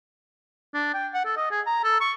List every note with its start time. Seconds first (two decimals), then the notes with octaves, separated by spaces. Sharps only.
0.74 D4
0.94 G5
1.14 F#5
1.25 A4
1.37 D#5
1.51 G#4
1.66 A#5
1.84 A4
2.01 C#6